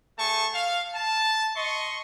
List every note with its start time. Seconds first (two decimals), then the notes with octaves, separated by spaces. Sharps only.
0.19 A3 G#4 A5 C#6
0.55 F5
0.95 A5
1.56 D#5 C6 C#6